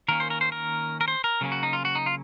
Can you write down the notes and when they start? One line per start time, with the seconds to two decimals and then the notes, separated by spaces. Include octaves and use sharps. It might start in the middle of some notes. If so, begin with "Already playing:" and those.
0.08 D#3 A#3 C#4 A#4
0.20 C5
0.30 A#4
0.41 C5
0.52 A#4
1.01 A#4
1.08 C5
1.24 A#4
1.41 C#3 F#3 A#3 C#4
1.52 F#4
1.63 D#4
1.73 F4
1.85 F#4
1.95 D#4
2.06 F4